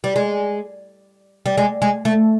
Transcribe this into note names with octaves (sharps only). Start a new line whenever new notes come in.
G3
G#3
G3
G#3
G#3
A3